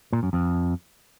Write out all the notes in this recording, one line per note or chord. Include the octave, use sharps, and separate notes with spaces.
A#2
F#2
F2